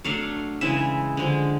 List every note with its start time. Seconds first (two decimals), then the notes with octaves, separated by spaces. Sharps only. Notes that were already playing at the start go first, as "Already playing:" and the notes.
0.04 F#3 A3 D4 F5
0.61 C#3 E3 G#3 E5
1.17 D3 F3 G#3